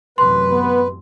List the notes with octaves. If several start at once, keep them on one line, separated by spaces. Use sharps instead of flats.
A1 F#2 C3 B4 C6
B3